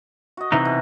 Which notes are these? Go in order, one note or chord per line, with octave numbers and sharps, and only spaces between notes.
F#4 D#5
C3 E3 D#4 E5
B2